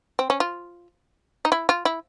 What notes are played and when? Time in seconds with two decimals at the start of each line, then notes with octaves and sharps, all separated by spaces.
0.19 C4
0.30 C#4
0.40 F4
1.45 D#4
1.52 E4
1.69 F4
1.85 E4